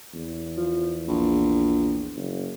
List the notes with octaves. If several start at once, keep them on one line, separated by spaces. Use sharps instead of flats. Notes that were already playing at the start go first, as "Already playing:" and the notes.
E2
F3
A#1
F#1